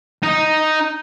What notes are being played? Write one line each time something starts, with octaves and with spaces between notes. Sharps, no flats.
D#4